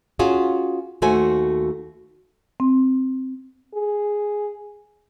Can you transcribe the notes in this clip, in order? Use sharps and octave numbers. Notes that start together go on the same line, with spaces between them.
C#4 F4 F#4 G#4
D#2 A3 F#4 C5 G#5
C4
G#4